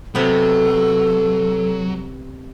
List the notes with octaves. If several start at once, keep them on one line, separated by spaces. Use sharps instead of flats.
C3 F#3 B3 A4